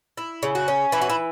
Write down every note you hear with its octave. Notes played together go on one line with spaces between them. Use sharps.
E4
C#3
F#4
C#4
E3 E4
F#4
E4